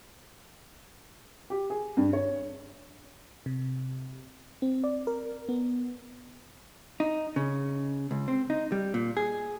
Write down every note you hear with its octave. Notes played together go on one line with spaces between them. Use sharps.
G4
G#4
G2
C#5
C3
C4
D5
A#4
B3
D#4
C#3
C#2
C4
D#4
G3
A#2
G#4